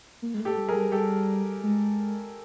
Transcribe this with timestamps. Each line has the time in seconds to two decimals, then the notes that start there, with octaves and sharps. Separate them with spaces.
0.22 A#3
0.34 G#3
0.40 A3
0.45 G4 A4
0.57 G3
0.68 F#3 G#4 A#4
0.75 G3
0.92 G3 G4 A4
1.63 G#3